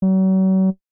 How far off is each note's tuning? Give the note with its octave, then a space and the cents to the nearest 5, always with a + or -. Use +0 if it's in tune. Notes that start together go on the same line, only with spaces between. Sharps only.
F#3 +40